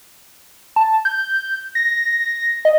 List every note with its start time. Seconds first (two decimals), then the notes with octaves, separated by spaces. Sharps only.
0.76 A5
1.05 G6
1.75 A#6
2.65 D#5